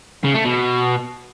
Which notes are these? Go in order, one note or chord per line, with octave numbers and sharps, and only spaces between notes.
C#3
A3
B2